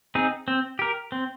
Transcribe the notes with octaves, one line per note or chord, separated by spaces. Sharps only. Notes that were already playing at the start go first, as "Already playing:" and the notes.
C4 D#4 G#4
C4
G4 A#4
C4